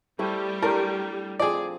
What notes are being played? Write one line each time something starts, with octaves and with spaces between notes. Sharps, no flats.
G3 A3 C4 E4
A3 D4 E4 G4 A#4
F3 C4 G#4 D5